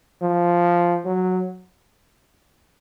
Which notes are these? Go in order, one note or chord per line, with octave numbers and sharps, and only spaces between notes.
F3
F#3